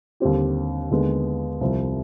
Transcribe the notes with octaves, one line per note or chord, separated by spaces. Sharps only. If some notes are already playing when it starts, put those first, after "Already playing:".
D#2 D3 G3 C4 G4
D#2 D3 G#3 B3 D4
C2 C3 F3